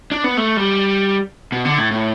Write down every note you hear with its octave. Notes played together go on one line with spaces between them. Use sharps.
D4
B3
A3
G3
B2
D3
A2
A2